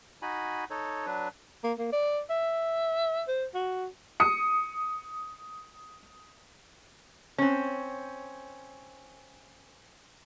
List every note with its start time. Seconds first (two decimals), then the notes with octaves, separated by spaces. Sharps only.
0.22 D#4 F#4 G#5 B5
0.70 D#4 A4 C#5
1.06 F#3 D4 B4
1.64 A#3
1.78 A#3
1.93 D5
2.30 E5
3.28 C5
3.55 F#4
4.20 D#6 C#7
7.38 C4 C#4